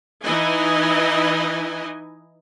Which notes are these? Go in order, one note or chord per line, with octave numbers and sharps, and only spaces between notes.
E3 D#4 E4 D#5 G#5